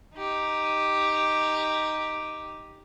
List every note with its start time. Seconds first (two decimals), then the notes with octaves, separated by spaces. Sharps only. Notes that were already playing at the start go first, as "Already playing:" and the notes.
0.16 D#4 G4